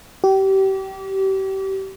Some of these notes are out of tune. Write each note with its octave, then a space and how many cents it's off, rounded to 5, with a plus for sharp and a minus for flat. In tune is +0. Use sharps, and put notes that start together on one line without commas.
G4 -30